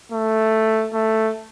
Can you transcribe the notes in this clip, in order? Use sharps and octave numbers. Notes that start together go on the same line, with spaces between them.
A3
A3